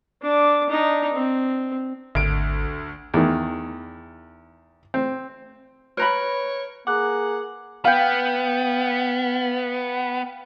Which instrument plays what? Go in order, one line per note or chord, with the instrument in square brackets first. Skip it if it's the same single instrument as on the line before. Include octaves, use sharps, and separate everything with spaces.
[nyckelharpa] D4 D6
D4 D#4
C4
[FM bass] G#1 [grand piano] D2 D7
[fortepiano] E2 D#3
C4
[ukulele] B4 A#5 B5 [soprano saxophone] C#5 [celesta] F6 D7
[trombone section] A#3 G#4 [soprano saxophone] F#5 [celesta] D6 F#6
[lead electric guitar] B3 [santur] F5 G5